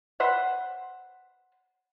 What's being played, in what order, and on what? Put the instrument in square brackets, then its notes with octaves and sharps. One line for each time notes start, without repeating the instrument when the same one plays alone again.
[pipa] B4 C5 E5 F#5